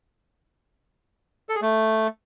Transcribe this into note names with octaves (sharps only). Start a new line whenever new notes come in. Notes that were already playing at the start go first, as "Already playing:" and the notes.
A4
G#4
A3